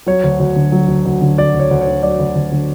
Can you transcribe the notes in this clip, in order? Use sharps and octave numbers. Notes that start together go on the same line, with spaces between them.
F#3 C#5
D2
D2
D3
F#3
D2
D2
D3
F#3 D5
D2
C#5
D2
C#5
D3
F#3 D5
D2
D2
D3